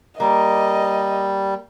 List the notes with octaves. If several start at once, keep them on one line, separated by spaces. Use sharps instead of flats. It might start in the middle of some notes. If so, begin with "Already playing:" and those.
G3 A#3 D#5